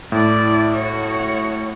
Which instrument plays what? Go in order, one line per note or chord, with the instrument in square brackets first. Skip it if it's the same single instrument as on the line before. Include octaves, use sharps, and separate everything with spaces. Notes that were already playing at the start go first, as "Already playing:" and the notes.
[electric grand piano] A2 [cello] E4 D5
[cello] F#4 C#5